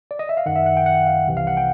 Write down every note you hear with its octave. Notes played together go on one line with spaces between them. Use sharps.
D5
D#5
E5
F5
F#2 D#3 F#5
E5
F#5
G5
F#5
F5
C2 C3 E3
F5
F#5
G5